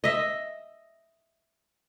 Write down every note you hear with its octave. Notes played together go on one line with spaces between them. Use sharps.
D#5 E5